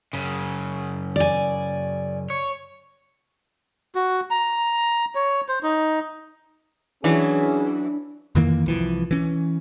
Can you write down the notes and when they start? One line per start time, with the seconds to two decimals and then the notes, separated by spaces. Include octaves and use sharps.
0.13 F#2 C#3
1.16 D5 G#5
2.30 C#5
3.95 F#4
4.31 A#5
5.15 C#5
5.49 C5
5.63 D#4
7.04 E3 F#3 C#4 D4 G#4
8.35 F2 D#3 E3 A#3
8.66 C2 E3 F3
9.11 E3 C#4